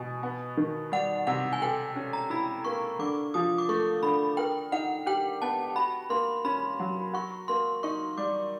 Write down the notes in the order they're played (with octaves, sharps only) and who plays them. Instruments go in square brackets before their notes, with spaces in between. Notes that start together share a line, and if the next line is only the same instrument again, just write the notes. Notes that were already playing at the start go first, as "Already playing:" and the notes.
Already playing: [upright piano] B2 [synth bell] G#5
[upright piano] B3
D#3
[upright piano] G3 [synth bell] F#5
[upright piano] C3 [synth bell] F#5
[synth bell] G#5
[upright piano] A4 [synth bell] G5
[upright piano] C#4
[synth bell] A#5
[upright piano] E4 [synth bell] B5
[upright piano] A#3 [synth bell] C#6
[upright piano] D3 [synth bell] D6
[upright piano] F3 [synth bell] D#6
[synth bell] D6
[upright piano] A3 [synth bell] C#6
[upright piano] D3 [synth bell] B5
[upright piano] A#4 [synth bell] G5
[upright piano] D#4 [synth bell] F#5
[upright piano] G4 [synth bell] G5
[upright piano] B3 [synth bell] A5
[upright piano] F#4 [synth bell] B5
[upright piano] A#3 [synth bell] C6
[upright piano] C#4 [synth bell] B5
[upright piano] F#3
[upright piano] F#4 [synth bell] C#6
[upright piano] A#3 [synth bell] C6
[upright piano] D#4 [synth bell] C#6
[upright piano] G3 [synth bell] D6